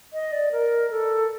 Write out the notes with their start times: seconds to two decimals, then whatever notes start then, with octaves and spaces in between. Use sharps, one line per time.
0.13 D#5
0.32 D5
0.52 A#4
0.90 A4